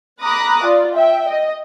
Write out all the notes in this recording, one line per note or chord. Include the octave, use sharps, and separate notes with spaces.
A#5 B5 D6 D#6 F#6 A#6
F4 D5
E5 G5
D#5